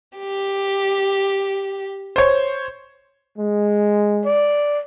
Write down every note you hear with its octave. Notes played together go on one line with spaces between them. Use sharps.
G4
C5 C#5
G#3
D5